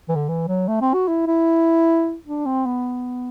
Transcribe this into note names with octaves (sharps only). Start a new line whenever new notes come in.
E3
D3
E3
F#3
A3
C4
F#4
E4
E4
D4
C4
B3